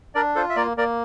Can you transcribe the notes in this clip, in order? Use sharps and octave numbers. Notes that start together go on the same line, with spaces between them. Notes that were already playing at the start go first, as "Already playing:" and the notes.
D4 A#4 D5
F4 A4 C5
E5
A#3 A#4 D5
A#3 A#4 D5